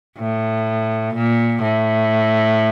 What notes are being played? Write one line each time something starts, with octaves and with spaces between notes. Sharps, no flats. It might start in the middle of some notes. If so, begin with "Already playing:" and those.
A2
A#2
A2